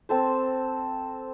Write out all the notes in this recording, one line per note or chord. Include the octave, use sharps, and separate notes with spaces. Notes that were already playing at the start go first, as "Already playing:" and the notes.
C4 A4 C5